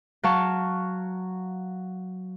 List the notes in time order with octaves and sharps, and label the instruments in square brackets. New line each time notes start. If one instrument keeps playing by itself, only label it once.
[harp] F#3 F5 A5 C#6